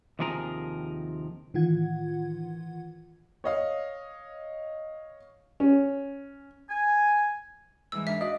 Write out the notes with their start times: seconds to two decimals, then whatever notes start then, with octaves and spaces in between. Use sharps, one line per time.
0.19 D#2 C3 F3 G#4 A#4
1.54 A2 D#3 E3 F4 F#5 G#6
3.44 C#5 D#5 F5
5.60 C#4
6.69 G#5
7.92 G#2 E3 G#3 E6
8.07 D4 A#4 E5
8.21 F#4 D5 D#5 F5